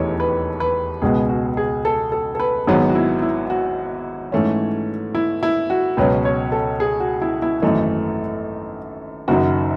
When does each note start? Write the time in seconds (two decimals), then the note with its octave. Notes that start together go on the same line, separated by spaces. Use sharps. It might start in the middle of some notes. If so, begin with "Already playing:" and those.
Already playing: E1 D#2 E3 A3 C#5 D#5
0.20 B4
0.60 B4
1.02 C#2 B2 G#3 B3 G#4
1.29 F#4
1.57 G#4
1.85 A4
2.12 A4
2.35 A4
2.40 B4
2.67 G#1 G#2 F#3 B3 G#4
2.89 F#4
2.95 E4
3.22 E4
3.50 F#4
4.32 G#2 E3 A3 C#4
5.15 E4
5.43 E4
5.70 F#4
5.97 C#2 B2 F#3 C#4 B4
6.25 C#5
6.52 A4
6.80 G#4
7.00 F#4
7.22 E4
7.42 E4
7.62 G#1 F#2 E3 A3 D#4
9.28 F#1 F#2 D#3 F#4